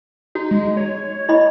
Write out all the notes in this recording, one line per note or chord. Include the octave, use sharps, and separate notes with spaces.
D#4 F#4
G#3
C#5
E4 D#5 B5